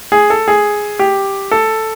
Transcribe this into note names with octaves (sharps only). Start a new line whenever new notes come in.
G#4
A4
G#4
G4
A4